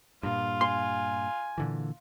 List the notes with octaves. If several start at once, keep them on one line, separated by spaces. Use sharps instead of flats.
G2 A#2 F4
G#5 C6
A#2 D3 E3